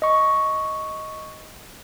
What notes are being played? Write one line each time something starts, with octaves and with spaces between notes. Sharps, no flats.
D#5 C#6